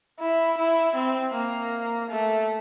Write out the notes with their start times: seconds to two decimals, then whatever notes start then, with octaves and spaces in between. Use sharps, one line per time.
0.20 E4
0.58 E4
0.96 C4
1.34 A#3
2.10 A3